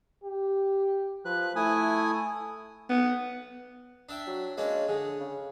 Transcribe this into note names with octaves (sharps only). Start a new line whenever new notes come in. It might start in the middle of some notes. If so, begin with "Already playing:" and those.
G4
F3 B4 F#6
A3 E4 G#5 D#6
B3
D4 E5 G5
F#3
G#3 A#3 C#4 D4
D3 G#4
C#3